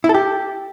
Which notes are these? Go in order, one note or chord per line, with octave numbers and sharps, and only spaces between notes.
E4
A4
G4